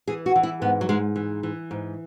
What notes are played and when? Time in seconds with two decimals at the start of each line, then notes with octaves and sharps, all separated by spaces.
0.07 E3 G#4
0.26 F#4
0.36 E3
0.43 E4
0.62 G#2 B3
0.81 F#3
0.89 G#2 G#3
1.16 E3
1.43 E3
1.71 G#2